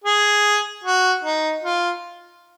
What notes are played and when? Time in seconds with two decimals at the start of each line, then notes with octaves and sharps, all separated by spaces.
0.04 G#4
0.84 F#4
1.24 D#4
1.63 F4